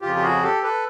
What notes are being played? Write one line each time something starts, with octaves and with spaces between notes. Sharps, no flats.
F2 C#3 F3 F4 G4
G4
F#4 G#4
G4 A4
A4 B4